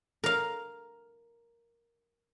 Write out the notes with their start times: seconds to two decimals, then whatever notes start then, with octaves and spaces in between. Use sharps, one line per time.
0.24 A#4 F5